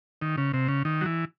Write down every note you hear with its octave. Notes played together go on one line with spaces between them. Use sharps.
D#3
C#3
C3
C#3
D#3
F#3
E3